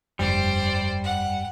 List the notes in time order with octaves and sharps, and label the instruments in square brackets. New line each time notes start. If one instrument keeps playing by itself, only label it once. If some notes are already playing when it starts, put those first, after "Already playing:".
[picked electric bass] F1 G2 [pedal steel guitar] G3 [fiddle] C5 D5
[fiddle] F#5